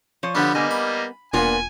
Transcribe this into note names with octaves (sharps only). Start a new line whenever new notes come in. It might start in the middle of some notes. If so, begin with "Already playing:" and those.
F3 C#5
D3 G3 B3 D4
G3 A#3 B3 D#4 A#4 G#5
B5
E1 A#2 B3 D4 F4 A#4 G#5